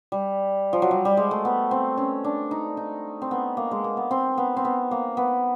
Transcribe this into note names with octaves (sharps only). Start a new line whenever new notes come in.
G3
F3
F#3
G3
G3
G#3
A3
B3
C4
C#4
D4
D#4
D#4
C4
B3
A#3
G#3
A#3
B3
C4
B3
C4
B3
A#3
B3